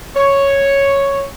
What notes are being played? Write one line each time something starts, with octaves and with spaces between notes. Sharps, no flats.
C#5